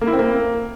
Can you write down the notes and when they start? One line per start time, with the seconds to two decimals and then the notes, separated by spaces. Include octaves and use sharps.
0.01 A#3
0.07 E4
0.13 C4
0.19 A#3